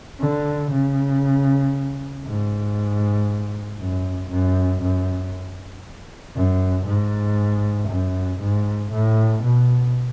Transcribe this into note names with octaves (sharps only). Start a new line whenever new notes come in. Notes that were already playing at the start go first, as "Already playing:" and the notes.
D3
C#3
G#2
F#2
F#2
F#2
F#2
G#2
F#2
G#2
A2
B2